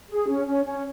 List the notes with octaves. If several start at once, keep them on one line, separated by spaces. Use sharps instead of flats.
G#4
C#4
C#4
C#4